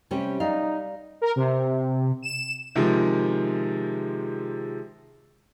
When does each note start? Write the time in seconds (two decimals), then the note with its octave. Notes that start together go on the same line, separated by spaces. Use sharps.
0.11 C3 G3 C#4
0.40 G3 D#4 F5
1.22 A#4
1.36 C3
2.23 E7
2.75 C3 D#3 F3 G#3